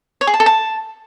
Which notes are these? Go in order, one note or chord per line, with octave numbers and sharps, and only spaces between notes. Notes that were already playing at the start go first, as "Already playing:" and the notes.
C#5
G#4
A5
A4
A5